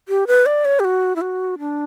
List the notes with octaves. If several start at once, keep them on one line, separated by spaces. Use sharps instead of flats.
G4
B4
D5
C#5
G4
F#4
E4
F#4
D4